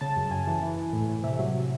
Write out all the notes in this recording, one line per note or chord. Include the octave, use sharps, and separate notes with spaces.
C#3 A5
F#2
F#2 G#5
E3
E3
E3
A2
A2
C3 E5
F#3